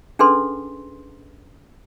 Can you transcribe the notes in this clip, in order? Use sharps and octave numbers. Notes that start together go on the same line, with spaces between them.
C#4 D4 G#4 A4 B4 C6